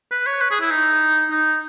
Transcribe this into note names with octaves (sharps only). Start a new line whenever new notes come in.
B4
C#5
B4
G#4
E4
D#4
D#4